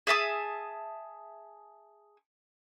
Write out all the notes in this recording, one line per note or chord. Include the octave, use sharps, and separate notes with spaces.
G#4 E5 A5 D#6